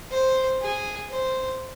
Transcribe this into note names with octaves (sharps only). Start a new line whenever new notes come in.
C5
G#4
C5